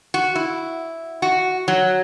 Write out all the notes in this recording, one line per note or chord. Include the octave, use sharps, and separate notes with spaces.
F#4
E4
F#4
F#3